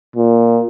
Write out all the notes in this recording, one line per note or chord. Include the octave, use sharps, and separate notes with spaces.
A#2